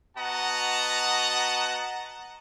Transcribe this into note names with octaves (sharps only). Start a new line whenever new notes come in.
B3 F#4 D#5 F#5 A5 A#5